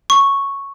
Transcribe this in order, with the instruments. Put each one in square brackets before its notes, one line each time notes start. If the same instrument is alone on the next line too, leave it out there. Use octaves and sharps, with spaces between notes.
[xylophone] C#6